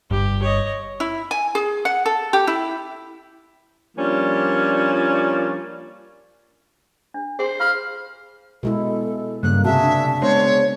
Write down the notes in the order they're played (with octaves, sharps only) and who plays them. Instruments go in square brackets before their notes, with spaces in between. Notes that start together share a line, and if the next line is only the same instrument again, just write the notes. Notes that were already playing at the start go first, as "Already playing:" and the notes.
[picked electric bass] G1 G2 [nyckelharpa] G4
[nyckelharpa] C#5 D#5
[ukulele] E4
G#5
G#4
F#5
A4
G4
E4
[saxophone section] F3 G3 A#3 C#4 D4
[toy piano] D4
[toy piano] G#4 C6 [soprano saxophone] C5
[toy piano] F4 C6 [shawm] F5
[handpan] B2 G#3 E4 [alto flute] A4
[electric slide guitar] G2 [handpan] C#3 A#3 [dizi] F#6
[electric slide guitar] C3 [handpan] F#4 G#4 [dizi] E5 [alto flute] A5
[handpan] D4
[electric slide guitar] G#3 B3 C4 [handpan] D4 C5 [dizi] C#5